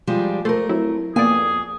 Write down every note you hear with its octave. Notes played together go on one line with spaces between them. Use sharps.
F3 G3 G#3
A3 A4 A#4 C5
F#3 C4 E4
F2 A#3 B3 G#4 D5 G#5